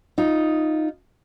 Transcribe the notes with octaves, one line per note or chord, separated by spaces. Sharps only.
D#4 F4